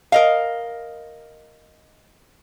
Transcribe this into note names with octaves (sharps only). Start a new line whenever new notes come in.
A#4 D#5 F5